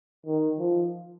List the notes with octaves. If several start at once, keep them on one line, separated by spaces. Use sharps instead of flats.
D#3
F3